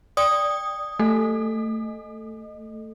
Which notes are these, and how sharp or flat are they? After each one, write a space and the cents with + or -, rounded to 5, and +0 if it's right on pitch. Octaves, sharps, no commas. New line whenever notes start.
D5 +0 G5 +10 D#6 +0
A3 +15 A4 +0